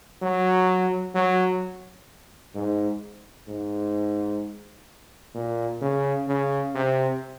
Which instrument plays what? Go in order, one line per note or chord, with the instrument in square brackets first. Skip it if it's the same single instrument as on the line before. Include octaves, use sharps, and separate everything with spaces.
[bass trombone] F#3
F#3
G#2
G#2
A#2
C#3
C#3
C3